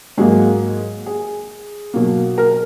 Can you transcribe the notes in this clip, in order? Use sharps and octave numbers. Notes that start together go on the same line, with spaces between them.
G#2 F#3 A#3 G#4
G#4
B2 F#3 A#3
A#4